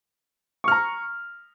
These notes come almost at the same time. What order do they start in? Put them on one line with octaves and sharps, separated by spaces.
C#6 F6 A#5